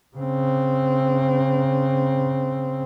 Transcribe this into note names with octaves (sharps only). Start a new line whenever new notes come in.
C#3 C4